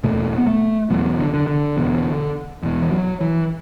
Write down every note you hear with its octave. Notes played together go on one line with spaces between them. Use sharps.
E2 B2 A3
B3
A3
E2 B2 F#3
D3
D3
D3
E2 B2
E2 B2
E3
F#3
E3